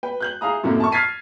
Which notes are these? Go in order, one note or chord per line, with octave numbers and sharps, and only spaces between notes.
B4 G5
F#6 G6 F#7
E4 G#4 F5 A#5 D#6
F#2 A2 C3 D#3 A#3 E4
A5 C#6
F6 G#6 A6 B6 C7 D#7